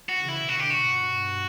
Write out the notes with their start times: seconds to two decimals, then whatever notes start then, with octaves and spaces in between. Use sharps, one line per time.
0.09 F#4
0.19 C#3 E3
0.28 E4
0.48 B2 D3 F#4
0.60 G4
0.70 F#4
0.77 G2 B2
1.06 G2 B2